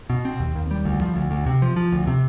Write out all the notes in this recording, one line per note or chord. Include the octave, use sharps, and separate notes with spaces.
B2
C4
D#2
D#2
G3
D2
F3
D2
D2
C3
F3
F3
D2
C3